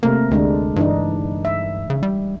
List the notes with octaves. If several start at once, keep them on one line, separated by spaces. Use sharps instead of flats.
C3 A3 A#3 A#4
D2 D3 G#3 D4
G2 E3 D4 D#4
E5
C#3
G3